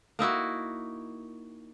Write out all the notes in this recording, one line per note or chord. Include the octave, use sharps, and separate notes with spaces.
A#3 D#4 E4 F#4